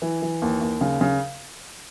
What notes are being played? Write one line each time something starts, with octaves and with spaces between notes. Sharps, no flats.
E3
E3
D#2
D#2
C#3
C#3